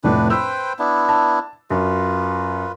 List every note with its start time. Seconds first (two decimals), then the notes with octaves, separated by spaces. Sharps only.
0.04 F1 A2 D4 B4
0.30 B4 C5 G5 B5 E6
0.79 B3 D4 E4
1.09 A5
1.71 F#2 F4 B4